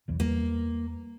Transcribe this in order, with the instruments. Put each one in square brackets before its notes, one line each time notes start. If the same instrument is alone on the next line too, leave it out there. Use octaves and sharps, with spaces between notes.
[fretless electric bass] B1 E2 E3
[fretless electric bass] E2 G3 [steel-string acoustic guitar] A#3